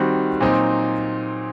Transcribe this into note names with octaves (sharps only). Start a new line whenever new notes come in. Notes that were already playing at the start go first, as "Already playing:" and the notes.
Already playing: D#3 G3 C4 F#4
A#2 F#3 C4 D#4